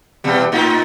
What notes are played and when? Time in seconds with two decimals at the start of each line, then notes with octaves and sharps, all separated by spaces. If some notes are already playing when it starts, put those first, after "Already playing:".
0.24 E2 B2 G3
0.52 A2 D#4 F4